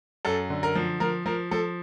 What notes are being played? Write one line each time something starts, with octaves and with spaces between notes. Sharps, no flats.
F#2 A4
D3
A#4
F3
F3 A#4
F3 A#4
F3 A4